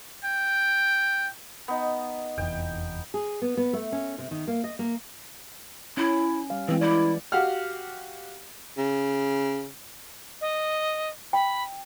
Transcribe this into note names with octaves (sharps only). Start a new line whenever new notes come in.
G5
B3 D#4
F1 E2 G5
G#4
B3
B3
A3
C#4
C3
D#3
A#3
D#5
A#3
C#4 E4
G3 F5
E3 G#3 C4
E4 D5
F#4 G4 F5 F#5 F6
C#3
D#5
G5 B5